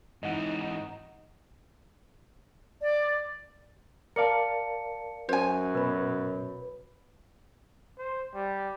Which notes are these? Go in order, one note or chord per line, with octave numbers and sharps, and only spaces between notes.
G#2 E3 D#4 D#5 F#5
D5
A#4 D5 F5 A5 C#7
F#2 C5 G#5
B2 B4 B5
C5
G3